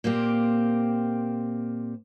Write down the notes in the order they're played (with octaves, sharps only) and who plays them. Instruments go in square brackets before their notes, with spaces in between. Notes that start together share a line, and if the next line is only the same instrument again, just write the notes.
[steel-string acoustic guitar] A#2 A#3 C4 G4